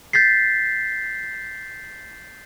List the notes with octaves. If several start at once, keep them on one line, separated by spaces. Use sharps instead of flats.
G6 A6 B6 C7